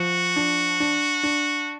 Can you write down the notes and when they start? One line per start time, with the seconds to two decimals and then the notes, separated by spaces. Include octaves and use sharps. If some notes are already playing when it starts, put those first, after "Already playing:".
Already playing: F3 F#4
0.36 D4
0.80 D4
1.23 D4